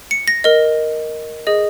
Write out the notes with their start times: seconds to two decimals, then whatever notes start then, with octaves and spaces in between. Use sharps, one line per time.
0.11 C#7
0.28 A#6
0.44 A#4 D#5
1.47 G#4 D#5